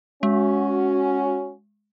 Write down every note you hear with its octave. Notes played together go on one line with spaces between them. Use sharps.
G#3 C#4 F#4